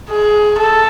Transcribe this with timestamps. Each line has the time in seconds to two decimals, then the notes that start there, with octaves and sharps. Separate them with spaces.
0.11 G#4
0.58 A4